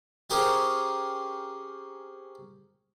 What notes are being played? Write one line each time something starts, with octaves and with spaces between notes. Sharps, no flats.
C4 C#4 G4 G#4 A#4